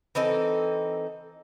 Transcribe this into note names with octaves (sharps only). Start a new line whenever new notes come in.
E3 C4 D#4 A4